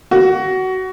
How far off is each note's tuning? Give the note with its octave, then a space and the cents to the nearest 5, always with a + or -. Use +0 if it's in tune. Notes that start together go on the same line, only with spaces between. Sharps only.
F#4 +20